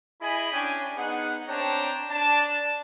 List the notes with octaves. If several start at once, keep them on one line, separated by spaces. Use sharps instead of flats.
E4 G#4 D#5 G#5 B5
C#4 D4 G5 G#5
B3 D#4 G#4 F#5
C4 D4 C#5 G5 A5 A#5
D4 A5